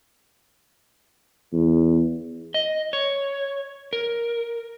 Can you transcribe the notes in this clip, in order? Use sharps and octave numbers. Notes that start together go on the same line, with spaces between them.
E2
D#5
C#5
A#4